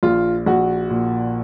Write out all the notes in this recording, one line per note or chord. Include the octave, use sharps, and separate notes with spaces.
A#1 F4
A#1 F#4
A#2